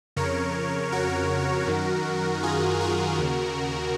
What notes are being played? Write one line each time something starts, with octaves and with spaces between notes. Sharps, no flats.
F2 C#3 A#4 C#5
F#4 A#4
F#2 D#3
F4 G#4
F#4 A#4
D#2 C#3